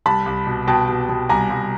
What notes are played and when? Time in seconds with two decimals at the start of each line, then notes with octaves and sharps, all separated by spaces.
0.06 C2 A5 B5
0.26 C2
0.47 B2
0.67 B2 G5 A5
0.88 B2
1.09 B2
1.29 C2 G#5 A#5
1.50 C2